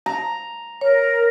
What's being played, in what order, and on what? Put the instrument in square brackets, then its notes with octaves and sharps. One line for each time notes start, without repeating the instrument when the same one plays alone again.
[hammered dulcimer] A#5
[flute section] A#4 [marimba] C#5